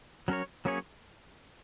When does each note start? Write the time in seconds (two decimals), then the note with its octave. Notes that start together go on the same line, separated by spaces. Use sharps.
0.28 F#3 C#4 A#4 C#5
0.65 F#3 A#3 C#4 G#4 C#5